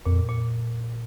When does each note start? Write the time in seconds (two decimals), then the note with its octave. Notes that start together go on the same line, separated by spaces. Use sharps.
0.06 F2 A#2
0.29 A#2